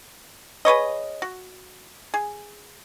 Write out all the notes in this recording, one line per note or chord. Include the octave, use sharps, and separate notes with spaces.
G#4 B4 C#5 D#5
F#4
G#4